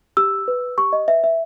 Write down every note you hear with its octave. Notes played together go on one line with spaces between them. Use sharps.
G4 E6
B4
G4 C#6
D#5
B4 E5
E5